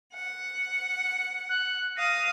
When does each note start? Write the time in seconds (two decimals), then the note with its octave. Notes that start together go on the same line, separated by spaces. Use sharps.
0.13 F#5
1.49 F#6
1.97 F5 D#6 A#6